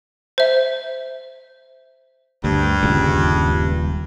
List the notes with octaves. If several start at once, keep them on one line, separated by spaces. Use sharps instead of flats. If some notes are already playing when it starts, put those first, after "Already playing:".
C5 E5
D2 G2
D#1 C#2